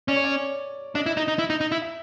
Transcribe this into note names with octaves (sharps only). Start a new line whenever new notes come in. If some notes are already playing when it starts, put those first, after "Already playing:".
C#4 D5
C#5
D5
D4 D#5
E4
D#4 D#5
D#4
E4
D#4
D#4
E4
E5